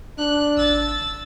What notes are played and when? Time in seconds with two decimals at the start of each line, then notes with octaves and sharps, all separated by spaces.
0.18 D4 F#6
0.57 G#1 E6 A6